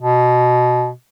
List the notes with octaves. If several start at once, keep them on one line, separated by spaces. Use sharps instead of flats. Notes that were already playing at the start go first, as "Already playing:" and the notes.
B2